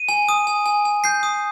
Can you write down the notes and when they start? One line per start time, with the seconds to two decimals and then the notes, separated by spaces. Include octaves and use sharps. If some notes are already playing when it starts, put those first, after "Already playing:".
Already playing: D#7
0.09 G#5
0.29 D#6
0.47 G#5
0.66 G#5
0.85 G#5
1.04 G6 C7
1.23 D#6